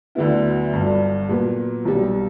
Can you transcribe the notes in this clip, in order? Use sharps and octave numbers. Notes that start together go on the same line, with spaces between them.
D2 D3 F#3 B3 E4
G1 G2 F#3
A#2 F#3 B3
B1 B2 G3